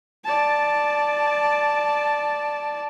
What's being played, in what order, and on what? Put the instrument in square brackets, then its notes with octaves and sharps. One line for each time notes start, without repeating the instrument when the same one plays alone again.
[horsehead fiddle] D5 A5